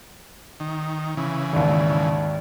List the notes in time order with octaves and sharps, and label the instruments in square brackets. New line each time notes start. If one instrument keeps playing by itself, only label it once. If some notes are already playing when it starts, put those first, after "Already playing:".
[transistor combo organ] D#3
C#3 E3
[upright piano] G#1 D#2